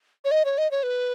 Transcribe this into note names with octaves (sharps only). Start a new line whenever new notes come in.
C#5
D#5
C#5
D#5
C#5
B4